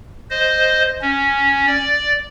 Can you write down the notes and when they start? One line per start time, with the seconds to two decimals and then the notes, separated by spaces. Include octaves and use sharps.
0.30 C5 D#5
1.02 C#4
1.66 D5